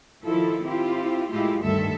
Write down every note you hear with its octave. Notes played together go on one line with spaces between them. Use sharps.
D#3 F3 E4 F4 A4
C4 E4 F4 G4
A2 G#3 A3 E4 F4 G4
D2 G2 D#3 G3 A4 E5